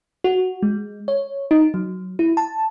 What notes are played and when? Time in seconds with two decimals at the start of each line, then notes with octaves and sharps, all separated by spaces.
0.24 F#4
0.63 G#3
1.08 C#5
1.51 D#4
1.74 F#3
2.19 E4
2.37 A5